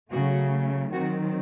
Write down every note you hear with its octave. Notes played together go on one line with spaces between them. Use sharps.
C#3 F#3 A3 F#4
D#3 F#3 C4 F#4